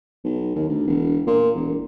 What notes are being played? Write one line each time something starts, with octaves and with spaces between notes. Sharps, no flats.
B1
D#2
D2
E1
A#2
E1